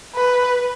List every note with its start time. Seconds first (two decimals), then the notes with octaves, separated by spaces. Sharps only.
0.16 B4